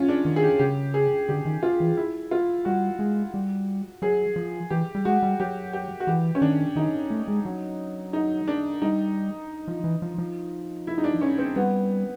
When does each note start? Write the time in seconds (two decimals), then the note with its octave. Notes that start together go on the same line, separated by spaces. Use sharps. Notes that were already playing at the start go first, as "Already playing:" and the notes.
Already playing: C#4 F4
0.08 D4
0.25 D#3
0.36 G#4
0.43 G4
0.59 C#3 G4
0.94 G#4
1.29 D3 G4
1.45 D#3
1.63 F4
1.80 E3
1.97 E4
2.31 F4
2.65 G3 F#4
2.99 G#3
3.34 G3
4.02 F#3 G#4
4.36 F3
4.70 E3 G4
4.95 G3
5.05 G#3 F#4
5.23 G3
5.40 F#3 G4
5.73 G4
6.00 F#4
6.07 E3 G4
6.35 C#4
6.41 D#3 D4
6.76 D#3 D#4
7.10 A3
7.28 G#3
7.45 F#3
8.13 D#4
8.48 D4
8.82 G3 D#4
9.68 F3
9.84 E3
10.02 F3
10.18 F3
10.87 E4
10.98 D#4
11.04 D4
11.21 C#4
11.38 C4
11.56 G3 B3